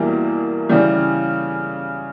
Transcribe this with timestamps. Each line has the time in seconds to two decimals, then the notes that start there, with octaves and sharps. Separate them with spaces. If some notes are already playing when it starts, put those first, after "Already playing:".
Already playing: E2 B2 G3 A#3 E4
0.69 C#3 E3 G3